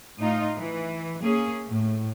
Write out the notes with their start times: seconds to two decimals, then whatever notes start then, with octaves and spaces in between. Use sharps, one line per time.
0.18 A2 D#4 F4
0.56 E3
1.21 A#3 C#4 G#4
1.68 A2